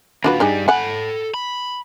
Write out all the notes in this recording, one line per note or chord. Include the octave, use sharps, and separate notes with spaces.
D#2 D4 F4 F#4 B4
G2 G3 D4 D#4 G#4
A4 F#5 G#5 B5
B5